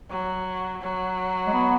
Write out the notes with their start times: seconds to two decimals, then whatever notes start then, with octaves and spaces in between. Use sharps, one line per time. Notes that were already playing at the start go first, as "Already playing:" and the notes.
0.11 F#3
0.82 F#3
1.47 G#3
1.53 B3